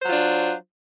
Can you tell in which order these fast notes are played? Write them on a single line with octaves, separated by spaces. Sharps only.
C5 F#3 F4 D4